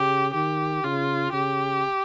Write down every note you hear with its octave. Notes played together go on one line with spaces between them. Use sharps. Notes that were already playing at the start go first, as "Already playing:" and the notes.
Already playing: C#3 G4
D#3 G4
C#3 F4
C#3 G4